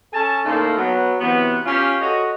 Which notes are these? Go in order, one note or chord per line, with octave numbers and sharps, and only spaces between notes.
C#4 A4 G#5 A5
A2 C#3 A#3 D#4 F4 A4
F#3 B3
C3 E3 F#3 B3
C#4 F4 G4
F#4 A4 C#5 D#5